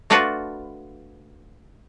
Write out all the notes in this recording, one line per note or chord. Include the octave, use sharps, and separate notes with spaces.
A3 D4 F4 F#4 B4